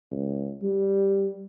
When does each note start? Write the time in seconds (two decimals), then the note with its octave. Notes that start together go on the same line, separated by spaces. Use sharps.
0.11 C#2
0.62 G3